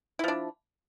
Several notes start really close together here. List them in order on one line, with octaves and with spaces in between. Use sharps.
E4 F3 D4